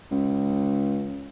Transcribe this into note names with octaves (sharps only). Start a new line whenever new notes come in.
C#2